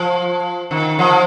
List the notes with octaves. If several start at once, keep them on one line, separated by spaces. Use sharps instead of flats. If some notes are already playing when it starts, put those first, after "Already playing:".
Already playing: F3
D#3
F3